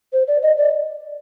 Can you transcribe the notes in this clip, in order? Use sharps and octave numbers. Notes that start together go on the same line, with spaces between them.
C5
D5
D#5
D5